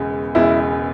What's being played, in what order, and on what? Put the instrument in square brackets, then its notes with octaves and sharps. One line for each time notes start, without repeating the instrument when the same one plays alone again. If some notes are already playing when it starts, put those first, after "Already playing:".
Already playing: [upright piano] E1 E2 C#3 G#3
[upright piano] E1 E2 C#3 G#3 [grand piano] E4